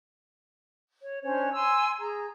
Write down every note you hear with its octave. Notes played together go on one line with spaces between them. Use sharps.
C#5
C#4 D4 C5 C#5
G#5 C6 E6
G#4 A#5